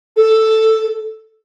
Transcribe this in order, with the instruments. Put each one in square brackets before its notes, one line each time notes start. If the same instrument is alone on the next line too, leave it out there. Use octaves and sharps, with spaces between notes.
[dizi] A4